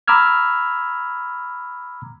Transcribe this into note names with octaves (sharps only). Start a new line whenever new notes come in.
A#5 B5 D6 E6 F6 G#6